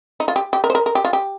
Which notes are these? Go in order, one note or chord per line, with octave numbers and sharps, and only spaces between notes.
D#4
F4
G4
G4
A#4
C5
A#4
A#4
G4
F4
G4